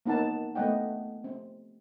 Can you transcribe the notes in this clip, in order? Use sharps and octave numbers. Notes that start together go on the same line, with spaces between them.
A#3 B3 D#4 F#5 A5
A3 B3 D#5 F#5 G5
C4